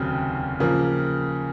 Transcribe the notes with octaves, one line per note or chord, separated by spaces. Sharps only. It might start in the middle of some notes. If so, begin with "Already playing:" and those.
Already playing: F1 D#2 C#3 F#3 C4
C#3 F3 A#3